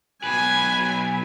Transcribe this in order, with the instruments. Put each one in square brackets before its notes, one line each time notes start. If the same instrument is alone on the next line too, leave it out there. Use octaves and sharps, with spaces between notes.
[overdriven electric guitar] B1 B4 [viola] G#5